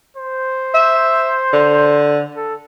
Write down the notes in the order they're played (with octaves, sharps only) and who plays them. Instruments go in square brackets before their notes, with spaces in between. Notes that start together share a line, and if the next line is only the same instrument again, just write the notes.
[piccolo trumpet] C5
[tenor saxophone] E5
D3
[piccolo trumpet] A4